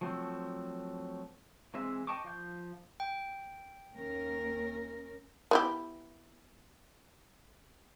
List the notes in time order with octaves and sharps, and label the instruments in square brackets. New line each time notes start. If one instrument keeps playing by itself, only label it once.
[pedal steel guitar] F3 F#3 A3 C4
E3 G#3 C4 E5
D#5 G5 A5 C#6 D6
F3 F5 G6
[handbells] G5
[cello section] D#2 C#4 A#4
[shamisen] B3 E4 G4